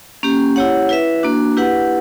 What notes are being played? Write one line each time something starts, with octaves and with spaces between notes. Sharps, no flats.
A#3 C#4 G4
E4 G4 C#5 F#5
E4 B4 E5
A#3 D4 F#4
E4 G4 B4 F#5